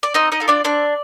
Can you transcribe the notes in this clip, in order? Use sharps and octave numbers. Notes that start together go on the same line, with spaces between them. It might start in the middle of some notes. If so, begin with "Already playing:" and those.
D5
C4 D#4 D#5
D#4 D#5
F4 A4
D4 D5
C4 D4 D5